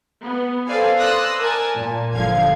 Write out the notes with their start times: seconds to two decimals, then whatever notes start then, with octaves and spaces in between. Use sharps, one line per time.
0.22 B3
0.67 A4 B4 C5 D5 F5 G#5
0.99 D5 C6 D#6 E6 F#6 A#6
1.40 A#4 G#5 A5
1.77 A#2
2.13 G1 D3 F3 F5 G#6